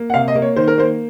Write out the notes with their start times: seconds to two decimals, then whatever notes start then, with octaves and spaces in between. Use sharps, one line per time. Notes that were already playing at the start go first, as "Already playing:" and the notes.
Already playing: A#3
0.10 F#5
0.14 C3 F5
0.28 D#5
0.35 A#3
0.42 C#5
0.56 D#3 C5
0.68 A#4
0.78 A#3 C5